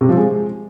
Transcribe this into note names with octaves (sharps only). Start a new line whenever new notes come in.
C3
F3
G#3